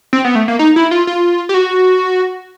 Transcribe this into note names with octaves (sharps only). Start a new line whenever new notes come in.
C4
B3
A3
A#3
D#4
E4
F4
F4
G4
F#4